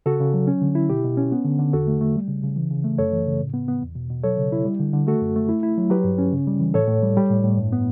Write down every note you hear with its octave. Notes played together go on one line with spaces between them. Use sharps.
C#3 F#4 A4
C#3
F#3
C#4
D3
E4
B2 G4
B2
C#4
B3
D3
D3
E2 F#4 A4
A3
A3
G3
C#3
C#3
E3
C#3
A3
F#2 A4 C#5
E3
C#3
A2
B3
B3
E2
B2
B2
F#3 A4 C#5
C#3
E4
G3
D3
D3
A3 F#4 A4
F#2
A3
E4
E4
F#3
F#3 G4 B4
G2
C#4
C#3
G3
E3
A2 A4 C#5
A2
G3
G3
A2
A2
G2
B3